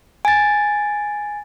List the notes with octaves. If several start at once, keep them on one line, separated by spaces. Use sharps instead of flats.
G#5 A6